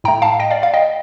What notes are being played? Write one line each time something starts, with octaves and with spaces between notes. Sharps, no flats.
A2 A3 G5 A#5
F5 A5
D#5 G5
D5 F5
D5 F5
D#5 G5